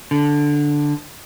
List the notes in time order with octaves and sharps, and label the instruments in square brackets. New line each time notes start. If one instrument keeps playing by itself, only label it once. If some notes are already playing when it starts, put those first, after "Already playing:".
[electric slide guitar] D3